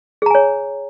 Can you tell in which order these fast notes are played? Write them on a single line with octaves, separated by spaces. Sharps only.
G#4 A#5 G#5 C#5